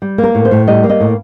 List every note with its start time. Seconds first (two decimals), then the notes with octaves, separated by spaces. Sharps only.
0.02 G3
0.18 A#3
0.23 A#4
0.35 A2
0.45 C5
0.51 A2
0.67 G3 D#5
0.84 A#3
0.90 D#5
1.00 A2